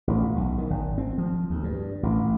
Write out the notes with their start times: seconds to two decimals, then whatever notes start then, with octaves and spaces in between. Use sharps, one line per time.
0.07 A1
0.36 B1
0.58 D#3
0.70 G#1
0.98 C4
1.18 F3
1.50 D2
1.64 G2
2.03 A1